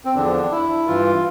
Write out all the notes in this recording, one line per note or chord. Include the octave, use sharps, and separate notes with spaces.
C4
E2 D3 F3 D4
E4
G2 E3 F4